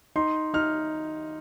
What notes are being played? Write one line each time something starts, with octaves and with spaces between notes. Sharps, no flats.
D#4 C6
D#4 F6